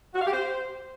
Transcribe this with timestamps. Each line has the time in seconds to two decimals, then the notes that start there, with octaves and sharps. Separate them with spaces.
0.14 F#4
0.21 F5
0.27 G4
0.33 C5